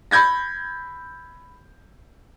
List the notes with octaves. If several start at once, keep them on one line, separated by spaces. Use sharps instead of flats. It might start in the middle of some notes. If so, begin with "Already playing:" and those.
B5 G6 G#6 A#6